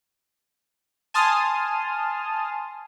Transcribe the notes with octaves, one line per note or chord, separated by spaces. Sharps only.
G#5 A5 C6 D#6 F6